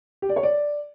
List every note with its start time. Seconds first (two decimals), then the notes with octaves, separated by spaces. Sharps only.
0.22 G4
0.29 D5
0.36 C#5
0.43 D5